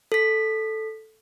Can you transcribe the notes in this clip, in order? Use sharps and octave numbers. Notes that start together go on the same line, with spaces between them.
A4 B6